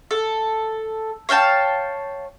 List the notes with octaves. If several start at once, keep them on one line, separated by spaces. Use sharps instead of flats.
A4
C#5 F5 G5 A5